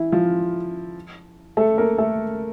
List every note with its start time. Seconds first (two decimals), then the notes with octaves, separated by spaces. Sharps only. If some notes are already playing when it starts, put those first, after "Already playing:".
Already playing: E3 E4
0.12 F3 F4
1.57 A3 A4
1.78 A#3 A#4
1.98 A3 A4